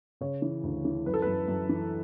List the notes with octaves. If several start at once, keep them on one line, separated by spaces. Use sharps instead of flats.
C#3 C#5
E3
D2
E3
F#2 B4
A4
F#2 B4
F#2
E3